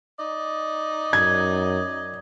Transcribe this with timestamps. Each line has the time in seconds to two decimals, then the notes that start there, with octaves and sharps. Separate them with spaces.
0.19 D#4 D5 D#5
1.13 F#2 G#6